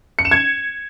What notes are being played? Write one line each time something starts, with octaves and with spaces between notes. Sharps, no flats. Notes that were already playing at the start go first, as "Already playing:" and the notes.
C#7
E7
G#6